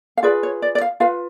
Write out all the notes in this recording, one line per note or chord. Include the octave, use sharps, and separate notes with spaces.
F5
F4 G#4 B4 D5
C#5
D5
D5
F5
F4 B4 F5